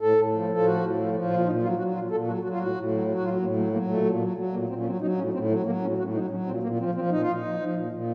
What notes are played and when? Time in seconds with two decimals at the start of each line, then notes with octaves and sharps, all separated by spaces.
0.01 A2 A4
0.17 A2
0.33 F3
0.50 F3 A4
0.66 A2 F#4
0.82 A2
0.98 F3
1.14 F3
1.30 A#2 F4
1.46 A#2 D#4
1.62 F#3 F4
1.78 F#3 F#4
1.95 A#2 F4
2.11 A#2 A4
2.27 F#3 F#4
2.43 F#3 F#4
2.52 F4
2.59 A2 F#4
2.75 A2
2.91 F#3
3.08 F#3
3.16 F#4
3.24 A2 F4
3.40 A2 A#3
3.56 F#3 A3
3.72 F#3 A#3
3.88 A#2 A3
4.05 A#2
4.21 F#3
4.37 F#3
4.53 A#2 A#3
4.69 A#2 C4
4.79 C#4
4.85 F#3 C4
5.01 F#3 D#4
5.18 A2 C#4
5.33 A2 C4
5.50 F#3 A3
5.66 F#3 A#3
5.82 A2 C#4
5.98 A2 F#4
6.14 F#3 D#4
6.30 F#3 C#4
6.46 A#2 C4
6.63 A#2 A#3
6.79 F3 C4
6.95 F3 C4
7.11 A#2 D#4
7.22 F4
7.27 A#2 D#4
7.44 F3
7.59 F3
7.75 A#2
7.92 A#2